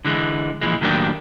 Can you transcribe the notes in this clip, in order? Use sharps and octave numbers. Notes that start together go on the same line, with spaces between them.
D3 E3 G#3
A#2 E3 F3 G#3
A2 D#3 F#3 A#3 D4 G4